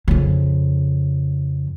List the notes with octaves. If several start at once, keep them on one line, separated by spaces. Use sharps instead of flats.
F2 C#3